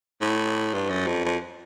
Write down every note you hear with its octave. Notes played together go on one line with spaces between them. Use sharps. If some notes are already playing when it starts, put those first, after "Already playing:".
A2
G2
F#2
F2
F2